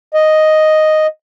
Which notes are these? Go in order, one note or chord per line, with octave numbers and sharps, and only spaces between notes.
D#5